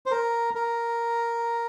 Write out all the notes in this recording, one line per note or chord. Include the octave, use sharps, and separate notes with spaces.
C5
A#4
A#4